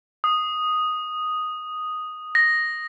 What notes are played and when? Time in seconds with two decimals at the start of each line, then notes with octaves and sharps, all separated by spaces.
0.24 D#6
2.35 A#6